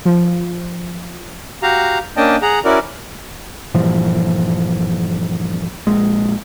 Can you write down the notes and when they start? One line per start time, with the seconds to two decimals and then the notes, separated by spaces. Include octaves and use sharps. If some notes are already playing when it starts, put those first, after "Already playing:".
0.05 F3
1.62 F#4 G4 F5 A#5
2.17 A#3 C#4 D4 D#5 G5 A5
2.42 G#4 F#5 A#5
2.65 C#4 E4 F#4 A#4 D5
3.74 G2 A#2 E3 F3
5.87 A#1 G#3